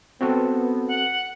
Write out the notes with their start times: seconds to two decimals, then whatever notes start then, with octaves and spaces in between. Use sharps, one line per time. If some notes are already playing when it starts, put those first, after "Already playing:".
0.21 B3 C4 F#4 A4
0.87 F#5